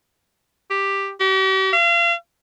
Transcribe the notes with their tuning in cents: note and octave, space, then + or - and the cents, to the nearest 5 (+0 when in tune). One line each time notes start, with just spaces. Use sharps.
G4 +5
G4 -45
F5 -35